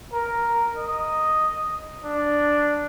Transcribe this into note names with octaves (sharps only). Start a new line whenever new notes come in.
A#4
D#5
D4